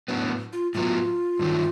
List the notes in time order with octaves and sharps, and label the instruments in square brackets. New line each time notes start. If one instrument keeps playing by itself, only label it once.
[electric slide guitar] A2 F#3 B3 [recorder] D4
[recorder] F4
[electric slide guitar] A2 F#3 B3 [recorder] F4
[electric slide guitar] G2 D#3 F#3 A3